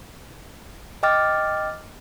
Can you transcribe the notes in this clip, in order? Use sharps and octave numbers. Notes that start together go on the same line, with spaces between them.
D#5 G5 D6 F6 A6